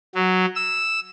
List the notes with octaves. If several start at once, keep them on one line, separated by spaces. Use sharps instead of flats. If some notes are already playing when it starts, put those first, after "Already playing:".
F#3
E6